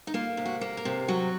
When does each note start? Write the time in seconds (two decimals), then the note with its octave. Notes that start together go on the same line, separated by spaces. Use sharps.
0.07 D#4
0.14 A#3 F4
0.37 C3
0.45 F#4
0.61 A#3
0.77 A#4
0.85 C3
1.08 F#3 F#4